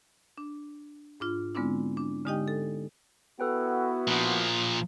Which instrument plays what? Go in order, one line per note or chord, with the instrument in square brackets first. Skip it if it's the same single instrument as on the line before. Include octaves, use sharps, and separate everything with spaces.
[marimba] D4
G#2 D4 F4
D3 G#3 B3 C4 D4 E4
D4
D3 G#3 D#4 G4 D#5 G5
A4
[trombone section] B3 E4 F#4 [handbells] A4 B4 G5
[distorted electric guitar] A#2 F3 [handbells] D#6 F#6 B6